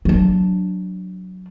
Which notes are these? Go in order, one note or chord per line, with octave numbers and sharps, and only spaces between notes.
F#3 D4